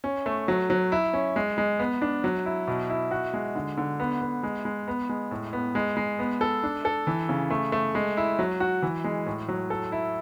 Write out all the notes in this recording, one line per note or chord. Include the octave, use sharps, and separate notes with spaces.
C#4
A3
F#3
F#3
E4
C#4
G#3
G#3
B3
D4
F#3
E4
B2
E4
F#4
G#3
D3
D3
B3
B3
G#3
G#3
B3
G#3
A2
B3
G#3
G#3
B3
A4
D4
A4
E3
C#3
A3
A3
G#3
E4
F#3
F#4
E3
G#3
A2
F#3
A4
E4